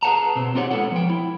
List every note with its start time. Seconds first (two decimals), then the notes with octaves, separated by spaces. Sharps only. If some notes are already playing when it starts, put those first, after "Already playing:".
0.03 G#4 B4 C5 F#5 A5 A#5
0.36 B2 C4
0.55 C4 D#4 F4 G4 C#5 F#5
0.71 G#3 B3 D4 F#4 A4 F#5
0.92 F3 G5
1.10 E4